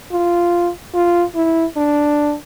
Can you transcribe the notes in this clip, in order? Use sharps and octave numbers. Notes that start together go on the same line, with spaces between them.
F4
F4
E4
D4